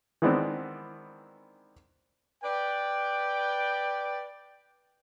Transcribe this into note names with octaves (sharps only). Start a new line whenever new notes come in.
D#3 E3 G#3 B3 C4 D4
B4 D5 G5